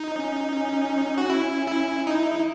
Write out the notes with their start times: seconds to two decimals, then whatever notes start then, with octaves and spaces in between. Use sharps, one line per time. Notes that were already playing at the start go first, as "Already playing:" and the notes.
Already playing: D#4
0.14 C#4
0.52 C#4
1.18 F#4
1.30 C#4 E4
1.68 E4
2.07 D#4 E4